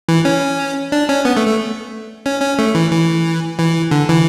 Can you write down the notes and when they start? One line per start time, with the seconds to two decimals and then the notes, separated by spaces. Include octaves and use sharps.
0.09 E3
0.25 C#4
0.92 D4
1.09 C#4
1.25 B3
1.37 A3
1.47 A3
2.26 C#4
2.41 C#4
2.59 A3
2.75 E3
2.92 E3
3.59 E3
3.91 D3
4.09 E3